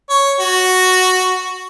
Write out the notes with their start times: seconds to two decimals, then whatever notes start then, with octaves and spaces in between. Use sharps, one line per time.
0.09 C#5
0.40 F#4